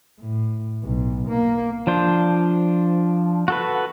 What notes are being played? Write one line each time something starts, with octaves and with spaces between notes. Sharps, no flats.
A2
B1
A#3
F3 D4 C5
F#4 A4 B4